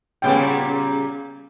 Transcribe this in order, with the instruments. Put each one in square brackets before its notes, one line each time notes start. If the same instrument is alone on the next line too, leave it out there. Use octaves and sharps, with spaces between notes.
[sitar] A#2 C#3 G3 [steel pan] B3 C#4 G5